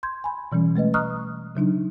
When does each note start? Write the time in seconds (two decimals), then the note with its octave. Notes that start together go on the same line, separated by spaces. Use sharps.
0.03 C6 G6 G#6
0.24 G#5 B5
0.52 B2 E3 G3 C#4
0.76 G#3 A3 B4 D#5
0.94 D#5 A#5 C#6 D#6 F6 F#6
1.55 C#3 F#3 D4 D#4